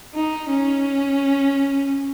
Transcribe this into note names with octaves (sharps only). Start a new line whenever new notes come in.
D#4
C#4